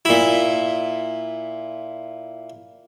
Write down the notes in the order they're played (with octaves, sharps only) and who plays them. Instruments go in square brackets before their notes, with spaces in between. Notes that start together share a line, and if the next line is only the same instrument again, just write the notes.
[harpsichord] A#2 E4